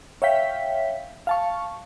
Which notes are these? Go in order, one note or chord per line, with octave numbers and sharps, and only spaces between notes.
C#5 E5 F5 G5 B6
F5 A5 C#6